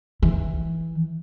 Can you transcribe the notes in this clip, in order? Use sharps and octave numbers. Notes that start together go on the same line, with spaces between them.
E3